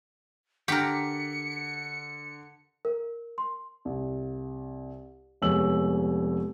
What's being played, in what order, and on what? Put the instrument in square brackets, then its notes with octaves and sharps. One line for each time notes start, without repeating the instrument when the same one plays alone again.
[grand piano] D3 B6 [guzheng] G4 A#4 [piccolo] C#7
[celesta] A#4
C6
[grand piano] C2
F1 G#3 B3 C#5 E6 F#7